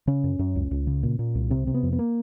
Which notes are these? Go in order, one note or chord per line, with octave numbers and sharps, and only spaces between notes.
C#3 C#4
F#2
F#2
C#2
C#2
C#3
A#2
A#2
C2
C3 C4
C3
B3
F2
B3
A#3